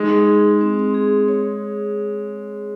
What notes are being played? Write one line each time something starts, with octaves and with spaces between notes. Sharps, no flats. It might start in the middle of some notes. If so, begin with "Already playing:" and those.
Already playing: G#3 D#4
G#4
C4
G#4
C#5